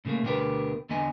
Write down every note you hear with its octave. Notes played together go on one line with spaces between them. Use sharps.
A2 C#3 F3 A3 A#3
D2 B2 D3 G4 A#4 B4
E2 D3 B3 D#5 G#5